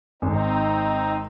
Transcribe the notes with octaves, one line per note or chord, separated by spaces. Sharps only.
G#1 C4 D#4